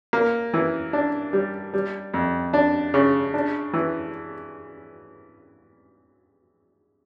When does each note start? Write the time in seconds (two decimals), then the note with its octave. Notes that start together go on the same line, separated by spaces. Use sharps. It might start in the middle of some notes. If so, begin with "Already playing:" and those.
0.13 A#3
0.54 E3
0.93 D4
1.33 G3
1.74 G3
2.14 F2
2.53 D4
2.94 C#3
3.34 D4
3.73 E3